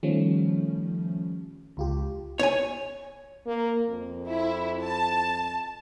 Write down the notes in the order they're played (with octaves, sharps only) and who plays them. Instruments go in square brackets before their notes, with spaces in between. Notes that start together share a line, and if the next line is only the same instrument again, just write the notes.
[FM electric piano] D#3 F3 G3 A3 C#4
C#2 F4 G4
[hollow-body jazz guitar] C#5 G#5
[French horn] A#3
F2
[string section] E4
A5